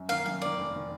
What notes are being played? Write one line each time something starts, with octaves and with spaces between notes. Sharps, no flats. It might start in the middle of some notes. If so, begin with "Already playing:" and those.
Already playing: F#2
D#3 A#3 F5
F#2 F5
D#3 A#3 D5
F1
D#3